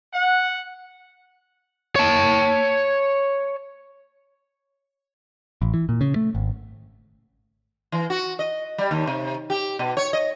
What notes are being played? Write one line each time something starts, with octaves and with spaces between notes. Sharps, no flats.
F#5
C#5 A5
A1
E3
A#2
C#3
A3
G#1
E3
F#4
D#5
G3
D#2
C3
G4
B2
C#5
D#5